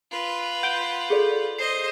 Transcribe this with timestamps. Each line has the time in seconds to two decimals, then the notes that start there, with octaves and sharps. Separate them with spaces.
0.11 F4 B4
0.63 F#5 G6 D7 G7
1.10 G#4 A4 D5
1.58 C5 D#5 C7